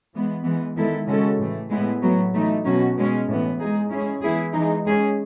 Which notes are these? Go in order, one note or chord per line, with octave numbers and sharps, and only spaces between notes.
E3 G#3 B3
E3 G#3 B3
D#3 G#3 B3 E4 A4
C#3 G#3 C#4 F#4 A4
A2 E3 A3
A2 G#3 B3 E4
A2 F#3 B3
E3 A3 D#4
B2 F#3 C#4 F#4
B2 G#3 C#4
A2 E3 B3
G#3 D#4 G#4
G#3 C#4 E4 G#4
E3 B3 E4 G#4
E3 G#3 D#4 G#4
G#3 C#4 G#4